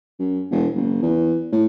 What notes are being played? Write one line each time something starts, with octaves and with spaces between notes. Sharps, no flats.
F#2
E1
F#1
E2
A2